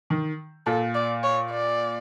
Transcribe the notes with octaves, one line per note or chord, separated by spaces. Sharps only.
D#3
A#2 A4
D5
C#5
D5